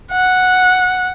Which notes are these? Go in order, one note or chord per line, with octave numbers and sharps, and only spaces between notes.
F#5